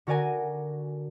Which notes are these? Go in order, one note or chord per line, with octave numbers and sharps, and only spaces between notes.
D3 F#4 A#4 D5 G#5 D#7